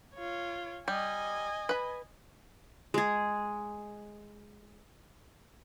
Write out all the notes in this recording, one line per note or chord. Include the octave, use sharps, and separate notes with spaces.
F4 C#5
G3 D#5 G#5
B4 B5
G#3 G#4